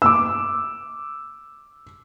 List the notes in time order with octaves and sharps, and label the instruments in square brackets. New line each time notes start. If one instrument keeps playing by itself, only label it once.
[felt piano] D6 E6